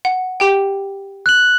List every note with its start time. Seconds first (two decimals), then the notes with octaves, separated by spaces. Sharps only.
0.05 F#5
0.40 G4 G5
1.26 F#6 F#7